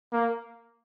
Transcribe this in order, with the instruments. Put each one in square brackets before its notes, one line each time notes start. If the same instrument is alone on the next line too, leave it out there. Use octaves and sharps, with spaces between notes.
[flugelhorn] A#3